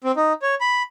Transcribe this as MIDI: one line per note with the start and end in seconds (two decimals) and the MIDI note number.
0.04 0.12 60
0.16 0.33 63
0.42 0.55 73
0.61 0.82 83